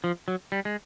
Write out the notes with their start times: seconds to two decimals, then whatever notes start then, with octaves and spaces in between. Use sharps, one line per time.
0.04 F3
0.28 F#3
0.52 G3
0.65 G#3